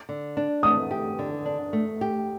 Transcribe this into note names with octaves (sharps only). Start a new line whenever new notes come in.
D3
D4
A3 D#6
G4
D3
D4
A3
G4